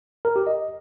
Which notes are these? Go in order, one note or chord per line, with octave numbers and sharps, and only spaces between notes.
A#4
G4
D#5